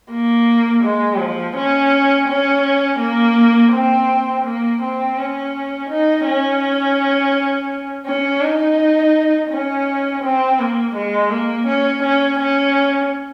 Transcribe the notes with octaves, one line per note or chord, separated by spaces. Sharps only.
A#3
G#3
F3
C#4
C#4
A#3
C4
A#3
C4
C#4
D#4
C#4
C#4
D#4
C#4
C4
A#3
G#3
A#3
C#4
C#4
C#4